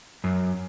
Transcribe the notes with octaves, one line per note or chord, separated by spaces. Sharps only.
F#2